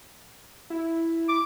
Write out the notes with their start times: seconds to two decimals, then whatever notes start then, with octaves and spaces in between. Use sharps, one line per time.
0.70 E4
1.29 D6